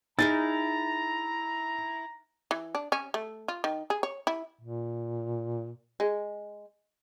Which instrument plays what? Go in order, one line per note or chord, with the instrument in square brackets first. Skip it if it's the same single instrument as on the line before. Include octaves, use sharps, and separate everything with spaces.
[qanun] D#4 G#4 A#4 [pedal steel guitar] E4 [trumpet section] A#5 [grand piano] A6
[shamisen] E3
D4
C#4
A3
F4
D#3
G#4
C#5
E4
[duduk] A#2
[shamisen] G#3